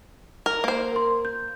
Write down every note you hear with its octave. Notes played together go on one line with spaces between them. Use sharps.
A#4
A#3 C5
A#4 C6
G6